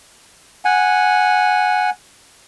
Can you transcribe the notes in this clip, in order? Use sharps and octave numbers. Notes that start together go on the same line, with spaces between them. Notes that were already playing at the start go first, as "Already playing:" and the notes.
F#5 G#5